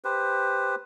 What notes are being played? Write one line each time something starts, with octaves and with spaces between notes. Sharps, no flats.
G4 B4 C5